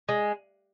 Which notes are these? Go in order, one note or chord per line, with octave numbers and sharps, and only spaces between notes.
G#3